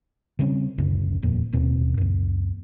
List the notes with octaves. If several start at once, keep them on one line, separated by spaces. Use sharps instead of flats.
C#3 G3 C4 C#4
D1 C#2 F#2 C#3
D#1 F2 A#2
D1 D#2 B2 C4
C#2 F#2